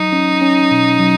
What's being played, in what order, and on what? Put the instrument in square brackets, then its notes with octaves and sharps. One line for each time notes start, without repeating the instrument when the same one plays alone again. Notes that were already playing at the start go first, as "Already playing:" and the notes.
Already playing: [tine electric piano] F#3 [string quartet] D#4
[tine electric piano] C#4
C#4
B2
F#3